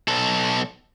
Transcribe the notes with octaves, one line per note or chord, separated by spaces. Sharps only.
B1 A4